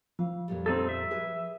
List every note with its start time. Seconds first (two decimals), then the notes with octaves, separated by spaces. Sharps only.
0.19 F3 F5
0.48 F2 A#2 G3
0.66 C4 D#4 A4
0.89 E5
1.11 G#4 B4